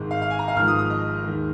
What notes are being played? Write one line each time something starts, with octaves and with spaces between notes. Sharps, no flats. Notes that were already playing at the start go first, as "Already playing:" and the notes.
Already playing: G#1 G#2 G#3
F5
F5
G#5
A#5
F5
G#1 G#2 F3 G#3 F6
D#6
D#6
D#5
D#2 D#3 G#3